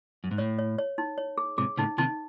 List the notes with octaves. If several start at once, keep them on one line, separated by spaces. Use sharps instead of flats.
F#2
G#2
A2 C#5
C#5
C#5
D#4
C#5
G#4
G#2 C3 G#4
A2 C#3 D#4
C3 D#3 D#4